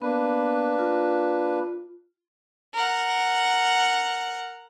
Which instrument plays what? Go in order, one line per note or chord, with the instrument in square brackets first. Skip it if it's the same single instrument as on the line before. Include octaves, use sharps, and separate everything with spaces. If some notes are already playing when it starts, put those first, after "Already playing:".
[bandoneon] A#3 D4 B4 [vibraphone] B3
[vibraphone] F4
[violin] A#4 F#5